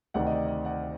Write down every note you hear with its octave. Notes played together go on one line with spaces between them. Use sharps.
D2 C3 D#3 D5 F#5
D#5
D5
D#5
D5 F#5